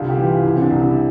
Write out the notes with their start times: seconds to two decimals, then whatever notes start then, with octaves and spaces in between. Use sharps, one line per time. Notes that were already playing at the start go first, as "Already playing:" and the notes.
Already playing: C2 D3 F4
0.09 G4
0.18 E3
0.27 F4
0.44 C2 E4
0.56 C4
0.62 D4
0.70 C2
0.79 E4